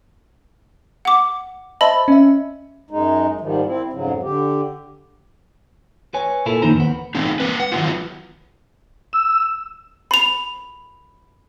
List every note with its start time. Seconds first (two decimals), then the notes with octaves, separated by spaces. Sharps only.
1.05 F#5 D6
1.81 C5 D#5 E5 A5 B5
2.08 C#4 E5
2.90 F#2 G#3 D#4
3.41 G#2 D#3 F3 G3
3.66 C4 E4
3.93 F2 G#2 C#3 F#3
4.23 D3 G4
6.14 B4 C#5 G#5
6.46 A#2 E4 F4 A4 A#4 G#5
6.62 F2 D#3 A#3 D#4 C5 A#5
6.76 D#2 B3
7.15 E3 A3 C4 D#4
7.40 G#3 A#3 B4
7.60 F#5
7.72 D#3 E3 F#3 G#3 B3 F4
9.13 E6
10.11 B5 F7